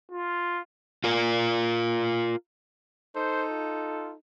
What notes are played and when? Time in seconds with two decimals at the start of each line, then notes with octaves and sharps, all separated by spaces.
0.12 F4
1.04 F4 A#4
3.16 D#4 A4 C5
3.52 F4